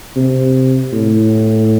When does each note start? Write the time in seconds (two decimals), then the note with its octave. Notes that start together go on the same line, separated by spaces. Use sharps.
0.16 C3
0.93 A2